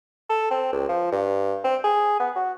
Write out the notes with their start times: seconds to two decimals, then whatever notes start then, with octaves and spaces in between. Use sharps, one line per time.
0.30 A4
0.51 C4
0.73 C#2
0.89 F3
1.12 G2
1.64 C4
1.84 G#4
2.20 B3
2.36 F#4